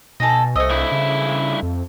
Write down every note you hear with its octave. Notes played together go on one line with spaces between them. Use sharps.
B2 D#4 A4 G#5 A#6
C2 A3 C5 D#5 E6
G2 E4
C#3
F2